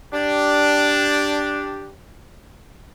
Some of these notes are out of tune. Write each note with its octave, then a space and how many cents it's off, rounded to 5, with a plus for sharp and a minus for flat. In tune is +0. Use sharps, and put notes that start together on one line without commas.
D4 +0 G4 +0